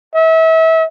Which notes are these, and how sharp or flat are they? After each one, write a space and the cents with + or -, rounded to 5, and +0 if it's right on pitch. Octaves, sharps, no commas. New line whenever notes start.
E5 -30